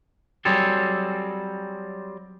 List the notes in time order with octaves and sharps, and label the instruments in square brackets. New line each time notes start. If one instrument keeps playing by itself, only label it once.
[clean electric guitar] F#3 G3 C4 G#4 A4